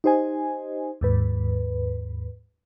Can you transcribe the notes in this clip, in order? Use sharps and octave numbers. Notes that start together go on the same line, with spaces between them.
D#4 G4 C5 D#5 G#5
D#2 G#2 B4